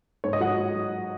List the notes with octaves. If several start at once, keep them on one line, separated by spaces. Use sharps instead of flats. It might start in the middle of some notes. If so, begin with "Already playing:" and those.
G#2 C#5
D#5
F#3 F#5